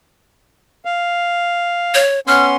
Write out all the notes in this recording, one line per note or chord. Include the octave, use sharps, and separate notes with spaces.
F5
C#5
B3 C#4 C6 F6